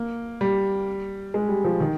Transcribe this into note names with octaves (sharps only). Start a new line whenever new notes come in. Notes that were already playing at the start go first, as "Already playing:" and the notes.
Already playing: A#3
G3
G#3
G3
F3
D#3